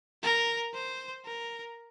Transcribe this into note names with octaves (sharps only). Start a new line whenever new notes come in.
A#4
C5
A#4